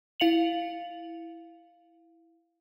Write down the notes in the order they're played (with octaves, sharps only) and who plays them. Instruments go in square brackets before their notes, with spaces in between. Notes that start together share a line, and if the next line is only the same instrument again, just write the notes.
[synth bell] E4 F5 C#7 F7 F#7